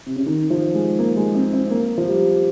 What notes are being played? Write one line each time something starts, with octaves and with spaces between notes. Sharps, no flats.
C3
C#3
D#3
F3
G#3
A#3
G#3
C4
C4
A#3
F3
G3